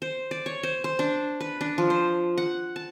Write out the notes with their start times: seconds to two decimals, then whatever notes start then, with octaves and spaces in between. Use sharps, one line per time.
0.02 C5
0.31 D5
0.46 C#5
0.63 C5
0.84 C5
0.99 D4
1.40 B4
1.61 D4
1.78 F3
1.90 C5
2.38 F#5
2.76 A5